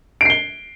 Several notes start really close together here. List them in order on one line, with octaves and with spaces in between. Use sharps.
D7 C7 G7